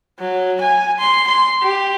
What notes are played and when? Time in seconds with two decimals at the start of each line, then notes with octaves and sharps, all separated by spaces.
0.20 F#3
0.61 G#5
1.00 C6
1.28 C6
1.62 G4